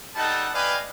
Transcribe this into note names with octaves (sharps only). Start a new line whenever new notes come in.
G3 D#4 A4 F#5 A5
B4 D5 D#5 F5 G5 G#5